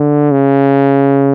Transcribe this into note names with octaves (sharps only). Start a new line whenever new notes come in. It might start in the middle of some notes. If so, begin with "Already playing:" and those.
Already playing: D3
C#3